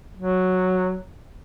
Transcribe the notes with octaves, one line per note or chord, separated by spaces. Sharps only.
F#3